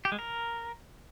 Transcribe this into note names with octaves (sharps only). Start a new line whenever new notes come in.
G4
G#3
A#4